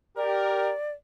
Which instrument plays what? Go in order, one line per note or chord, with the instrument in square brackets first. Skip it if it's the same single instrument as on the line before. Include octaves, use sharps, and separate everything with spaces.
[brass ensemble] G4 A#4 [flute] D5